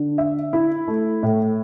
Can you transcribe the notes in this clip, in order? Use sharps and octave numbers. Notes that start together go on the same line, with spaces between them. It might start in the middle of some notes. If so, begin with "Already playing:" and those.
Already playing: D3 D4
E5
E4
A3
A2